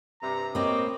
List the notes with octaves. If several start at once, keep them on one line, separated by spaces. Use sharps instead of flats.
G2 C3 A#5
B2 A#3 C4 C#5 D#5 D6